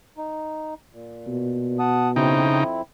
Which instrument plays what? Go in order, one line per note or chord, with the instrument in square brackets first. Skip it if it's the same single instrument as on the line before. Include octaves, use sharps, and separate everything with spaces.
[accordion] D#4
A#2
[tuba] B2
[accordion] F#5 A5 D#6
[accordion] F2 C4 E4 [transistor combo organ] C#3 D#4 G5